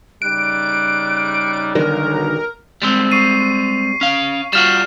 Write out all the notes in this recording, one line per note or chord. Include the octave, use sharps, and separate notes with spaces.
C#3 G3 D#4 F#6 D7
B1 D3 D#3 G3 A#4
G3 G#3 C4
C#6 C7 D#7
C#4 F5
G3 F4 F#4 F6 E7